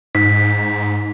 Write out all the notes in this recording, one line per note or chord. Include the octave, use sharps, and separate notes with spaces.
G#2 D#4 B6